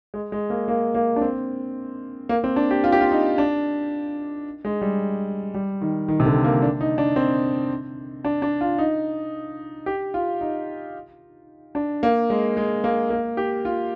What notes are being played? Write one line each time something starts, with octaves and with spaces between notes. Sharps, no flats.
G#3
G#3
A#3
A#3
A#3
D4
C4
A#3
C4
D4
G4
F4
G4
F4
D#4
D4
G#3
G3
G3
D#3
D#3
C3
D3
A#3
D4
D#4
D4
C4
D4
D4
F4
D#4
G4
F4
D#4
D4
A#3
G#3
G#3
A#3
A#3
G4
F4